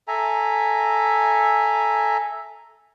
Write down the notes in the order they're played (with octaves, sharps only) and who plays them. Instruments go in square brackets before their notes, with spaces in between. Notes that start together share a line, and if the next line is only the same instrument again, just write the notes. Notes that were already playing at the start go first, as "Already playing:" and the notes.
[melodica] A4 E5 G#5 A#5